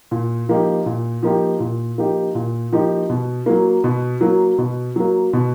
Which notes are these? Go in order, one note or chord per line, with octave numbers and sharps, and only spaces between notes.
A#2
F3 A#3 D#4 G4
A#2
F3 A#3 D#4 G4
A#2
F3 A#3 D#4 G4
A#2
F3 A#3 D#4 G4
B2
F#3 A#3
B2
F#3 A#3
B2
F#3 A#3
B2